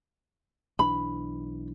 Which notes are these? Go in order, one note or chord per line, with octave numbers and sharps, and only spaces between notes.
B1 E3 D4 B5